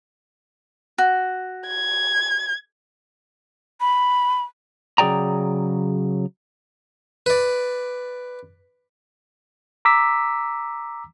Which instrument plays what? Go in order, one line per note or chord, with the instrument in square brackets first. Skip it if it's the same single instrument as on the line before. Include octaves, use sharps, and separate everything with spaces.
[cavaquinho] F#4
[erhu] G#6
[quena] B5
[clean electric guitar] C#3 F#3 G#4 D5 G5 A#5
[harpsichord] B4 D5
[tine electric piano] A#5 D6 E6 B6